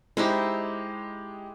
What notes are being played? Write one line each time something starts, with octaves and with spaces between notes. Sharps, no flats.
G#3 D#4 E4 G4 C5